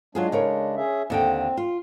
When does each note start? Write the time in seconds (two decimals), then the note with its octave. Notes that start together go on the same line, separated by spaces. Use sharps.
0.15 F#3 G#3 D4 F4 G#4
0.32 C#3 A#4 C#5
0.76 C#4 G#4 E5
1.10 D#2 D3 C4 G5
1.57 F4